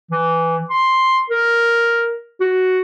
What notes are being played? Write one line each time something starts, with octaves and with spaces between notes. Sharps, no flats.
E3
C6
A#4
F#4